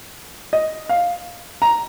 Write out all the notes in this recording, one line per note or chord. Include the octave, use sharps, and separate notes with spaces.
D#5
F5
A#5